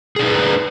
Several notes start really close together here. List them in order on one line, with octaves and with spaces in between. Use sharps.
G#4 D4 D#4 B4